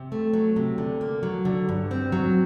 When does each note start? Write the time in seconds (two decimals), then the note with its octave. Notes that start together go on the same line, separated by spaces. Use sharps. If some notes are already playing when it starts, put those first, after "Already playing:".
Already playing: C3
0.12 A3
0.33 F#3
0.56 C3
0.78 D3
1.01 A#3
1.23 F#3
1.45 D3
1.69 G2
1.91 C4
2.12 F#3